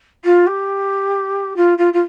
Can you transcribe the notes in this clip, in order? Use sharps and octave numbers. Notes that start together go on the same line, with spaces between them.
F4
G4
F4
F4
F4